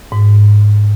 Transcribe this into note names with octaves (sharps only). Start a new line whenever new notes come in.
G#2